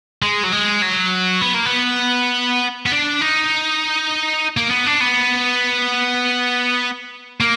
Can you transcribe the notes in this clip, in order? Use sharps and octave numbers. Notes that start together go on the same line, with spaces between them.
G#3
F#3
G#3
F#3
B3
A#3
B3
B3
D4
D#4
A#3
B3
D4
B3
A#3